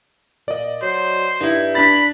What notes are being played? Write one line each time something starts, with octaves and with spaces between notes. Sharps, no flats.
A#2 D5 D#5
F#3 C5
G2 D#4 E4
D4 B5 A6